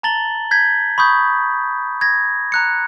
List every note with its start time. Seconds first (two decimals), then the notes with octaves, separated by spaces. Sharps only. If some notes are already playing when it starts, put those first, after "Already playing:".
0.03 A5 A#5 A6 F#7 G7
0.51 G6 G#6 B6
0.98 B5 C#6 D#6 G6
2.01 G#6 A#6
2.52 A#5 F#6 C#7